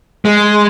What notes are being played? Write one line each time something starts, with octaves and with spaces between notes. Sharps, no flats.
G#3